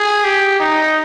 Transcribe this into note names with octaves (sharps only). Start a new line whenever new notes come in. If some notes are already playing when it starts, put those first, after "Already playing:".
Already playing: G#4
G4
D#4